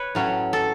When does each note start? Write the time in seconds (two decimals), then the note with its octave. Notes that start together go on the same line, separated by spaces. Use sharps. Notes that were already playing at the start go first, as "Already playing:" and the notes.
Already playing: B4 C#5
0.15 A2 F#3 C#4
0.53 A4